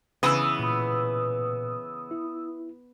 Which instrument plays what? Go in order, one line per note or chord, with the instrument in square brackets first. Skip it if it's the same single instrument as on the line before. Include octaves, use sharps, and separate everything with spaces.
[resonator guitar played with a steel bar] C#3 E3 [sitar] B3 [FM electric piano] D#6 E6
[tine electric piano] A#2 B5
E4